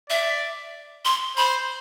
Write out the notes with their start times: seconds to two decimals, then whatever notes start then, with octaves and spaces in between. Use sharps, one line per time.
0.09 D5 E5
1.05 C6
1.37 C5 B5